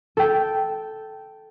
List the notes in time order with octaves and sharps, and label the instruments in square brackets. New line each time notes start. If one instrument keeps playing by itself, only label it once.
[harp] A4 G5